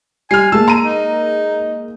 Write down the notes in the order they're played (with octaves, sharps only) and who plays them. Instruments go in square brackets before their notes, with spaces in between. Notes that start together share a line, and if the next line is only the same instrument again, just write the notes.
[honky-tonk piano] G3 [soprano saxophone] G#5 [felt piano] F6 C7
[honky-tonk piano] G#3 A#3 [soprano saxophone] A5 [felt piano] E6
[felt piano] A#5 D#7
[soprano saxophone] D#4